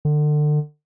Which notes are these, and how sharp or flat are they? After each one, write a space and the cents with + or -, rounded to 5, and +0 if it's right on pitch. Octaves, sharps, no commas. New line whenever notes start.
D3 +30